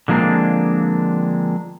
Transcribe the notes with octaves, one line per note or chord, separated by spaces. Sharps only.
D3 F3 G#3 A#3 C4 D4